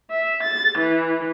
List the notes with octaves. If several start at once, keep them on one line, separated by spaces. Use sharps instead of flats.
E5
A6
E3